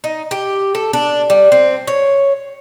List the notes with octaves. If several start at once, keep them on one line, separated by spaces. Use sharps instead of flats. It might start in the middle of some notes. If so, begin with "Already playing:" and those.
D#4
G4
A4
D4
G3
C4
C#5